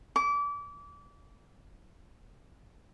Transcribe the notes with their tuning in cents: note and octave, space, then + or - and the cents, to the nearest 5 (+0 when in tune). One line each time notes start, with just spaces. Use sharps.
D6 -30